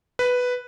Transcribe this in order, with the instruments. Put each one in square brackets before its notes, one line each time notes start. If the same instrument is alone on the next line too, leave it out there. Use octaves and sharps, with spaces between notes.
[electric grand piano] B4